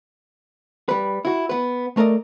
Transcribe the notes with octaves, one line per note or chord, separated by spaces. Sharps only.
G3 B4
E4 F#4
B3 B4
A3 A#4 D5 D#5